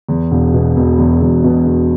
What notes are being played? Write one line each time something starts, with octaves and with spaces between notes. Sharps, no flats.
E2
E1
B2
E1
E2
E1
B2
E1